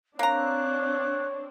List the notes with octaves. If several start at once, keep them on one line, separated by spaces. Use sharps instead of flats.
A#3 C4 D4 C#5 A#5 F#6